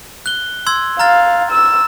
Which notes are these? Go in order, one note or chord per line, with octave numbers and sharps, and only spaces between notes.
F#6 G7
C6 E6 G#6
F5 A#5 F6 A6
E6